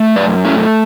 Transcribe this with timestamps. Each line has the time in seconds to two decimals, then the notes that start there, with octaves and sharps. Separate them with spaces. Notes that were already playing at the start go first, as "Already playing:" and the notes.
Already playing: A3
0.16 F#2 B4 D5
0.45 A3 C#4 E4